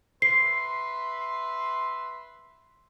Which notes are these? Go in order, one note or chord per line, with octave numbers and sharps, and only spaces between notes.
B4 E5 C6 C7